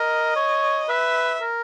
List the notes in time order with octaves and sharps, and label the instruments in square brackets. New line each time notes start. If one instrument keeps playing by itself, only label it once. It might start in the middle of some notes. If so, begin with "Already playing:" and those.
Already playing: [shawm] A#4 [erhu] D#5
[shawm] C#5
[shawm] B4 [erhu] E5
[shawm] A#4